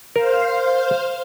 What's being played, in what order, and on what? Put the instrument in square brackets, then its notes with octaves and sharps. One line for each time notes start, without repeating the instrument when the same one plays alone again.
[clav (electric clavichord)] A#4 [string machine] C5 F5